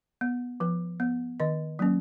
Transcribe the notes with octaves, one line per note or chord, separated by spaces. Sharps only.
B3
F3 B4
B3
D#3 D#5
F#3 A#3 C#4